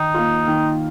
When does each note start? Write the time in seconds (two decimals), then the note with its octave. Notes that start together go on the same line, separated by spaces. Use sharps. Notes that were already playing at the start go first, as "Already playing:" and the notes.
Already playing: D#3 D#4
0.14 A#3 F4
0.48 D#3